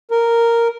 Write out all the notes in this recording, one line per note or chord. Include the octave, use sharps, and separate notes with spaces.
A#4